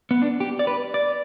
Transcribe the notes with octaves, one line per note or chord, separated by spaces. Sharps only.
B3
D4
G4
D5
B4
D5